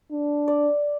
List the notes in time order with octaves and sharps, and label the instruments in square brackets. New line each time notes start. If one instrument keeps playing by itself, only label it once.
[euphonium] D4
[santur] D5